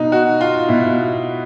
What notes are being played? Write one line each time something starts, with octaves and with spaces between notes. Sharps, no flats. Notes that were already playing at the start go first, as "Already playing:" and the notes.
Already playing: B2 D#4
F#4
F4
B2 E4